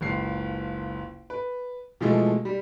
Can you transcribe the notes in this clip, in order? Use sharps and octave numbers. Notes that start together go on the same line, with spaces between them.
F#1 C#2 C7
B4
B2 E3 F3 G#3 A3
G3